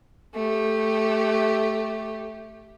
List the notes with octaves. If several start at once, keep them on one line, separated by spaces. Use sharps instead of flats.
A3 G4